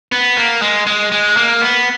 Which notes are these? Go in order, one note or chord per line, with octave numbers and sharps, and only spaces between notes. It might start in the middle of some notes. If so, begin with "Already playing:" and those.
B3
A#3
G#3
G#3
G#3
A#3
B3